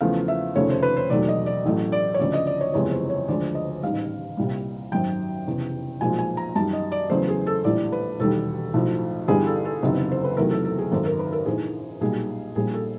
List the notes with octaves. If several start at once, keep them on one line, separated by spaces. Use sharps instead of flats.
E2 C#3 F3 A3 F5
E5
F1 D#2 C#3 F3 A3 C#5
C5
B4
C5
E1 D#2 D#3 F#3 A3 D5
D#5
D5
A1 A2 F#3 A3
D5
C#5
D2 C#3 F3 D5
D#5
D5
C#5
F#1 E2 C3 F3 G#3 C#5
C5
C#5
D2 D3 F3 G#3 D5
D#5
A1 G#2 D#3 G3 F5
C2 A#2 G3
G#1 F#2 D#3 F#3 G5
F1 E2 C#3
B1 A#2 F3 G#3 G#5
G#5
A#5
F#2 D#3 G3 A5
D#5
D5
E2 C#3 F#3 A3 C5
G#4
A4
A#1 A2 E3 G3 D5
B4
E1 D#2 D#3 G3 A4
B1 A2 F3
G1 G2 E3 G3 G#4
A4
A4
F#1 E2 C3 D#3 F#3
C5
B4
E2 C3 D#3 F#3 A3 A#4
A4
A4
G#4
G#1 F#2 D#3 A4
A#4
B4
A#4
A#1 G#2 E3 G#4
B1 A#2 G3 G#4
A#1 A#2 G3 G#4
A4